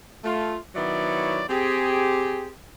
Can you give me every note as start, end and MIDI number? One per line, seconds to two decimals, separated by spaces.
0.24 0.56 57
0.24 0.56 65
0.75 1.44 51
0.75 1.44 54
0.75 1.44 59
0.75 1.44 64
0.75 1.44 73
0.75 1.44 74
1.49 2.50 60
1.49 2.50 67
1.49 2.50 68